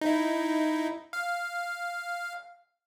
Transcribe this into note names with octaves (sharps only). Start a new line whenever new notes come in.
D#4 E4
F5